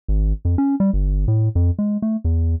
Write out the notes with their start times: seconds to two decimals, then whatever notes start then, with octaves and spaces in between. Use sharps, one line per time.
0.08 G#1
0.45 F2
0.58 C#4
0.80 G3
0.93 G1
1.28 A2
1.55 F2
1.79 G#3
2.02 A3
2.24 E2